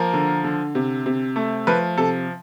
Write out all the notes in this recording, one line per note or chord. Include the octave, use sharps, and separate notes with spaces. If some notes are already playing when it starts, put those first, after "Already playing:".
Already playing: F3 A#3 A#4
D3
D3
C3
C3
A3
F3 B4
C3 A4